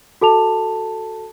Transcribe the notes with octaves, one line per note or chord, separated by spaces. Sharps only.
F#4 A4 A5 F7